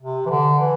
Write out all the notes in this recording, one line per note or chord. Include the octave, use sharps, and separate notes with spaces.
C3
E3
D3
E3